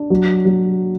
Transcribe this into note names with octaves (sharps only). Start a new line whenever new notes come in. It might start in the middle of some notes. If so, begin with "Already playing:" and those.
Already playing: D4
F#3
F#3